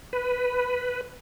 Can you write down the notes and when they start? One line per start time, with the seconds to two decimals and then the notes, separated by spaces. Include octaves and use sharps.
0.13 B4